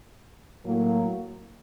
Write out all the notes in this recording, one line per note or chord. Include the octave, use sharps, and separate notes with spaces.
A2 F#3 A#3